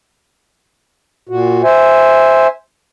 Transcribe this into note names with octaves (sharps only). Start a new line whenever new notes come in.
A#2 F#4
C5 E5 G#5